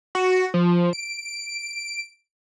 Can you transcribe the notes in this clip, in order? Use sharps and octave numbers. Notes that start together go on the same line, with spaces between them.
F#4
F3
D7